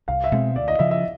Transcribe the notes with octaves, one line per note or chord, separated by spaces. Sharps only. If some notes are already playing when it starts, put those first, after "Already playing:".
C2 F5
E5
B2 G#3 C4
D2 D5
D#5
C#3 F3 E5
E5